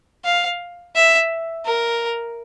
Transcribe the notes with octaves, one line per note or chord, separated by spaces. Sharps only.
F5
E5
A#4